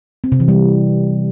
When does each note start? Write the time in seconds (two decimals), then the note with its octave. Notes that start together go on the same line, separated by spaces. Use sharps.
0.24 C4
0.32 C3
0.40 E3
0.48 G3